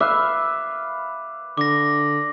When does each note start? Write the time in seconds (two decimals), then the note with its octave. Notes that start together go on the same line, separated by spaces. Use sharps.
0.01 B4 E5 F5 D6 F#6
1.58 D3 D6 A#6